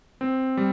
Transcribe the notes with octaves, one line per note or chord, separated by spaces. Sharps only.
C4
G3